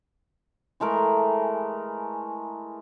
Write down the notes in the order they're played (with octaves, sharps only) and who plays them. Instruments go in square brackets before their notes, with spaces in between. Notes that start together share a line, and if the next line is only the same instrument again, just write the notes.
[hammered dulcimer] E3 G#3 A3 A#4